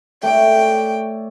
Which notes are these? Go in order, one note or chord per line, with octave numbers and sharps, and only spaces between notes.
A3 C#5 D5 G5